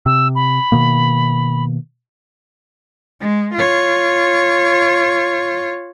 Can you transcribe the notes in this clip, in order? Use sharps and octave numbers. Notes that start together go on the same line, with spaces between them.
C3 E6
B5
B2 D#3 A#3
G#3
F4 C#5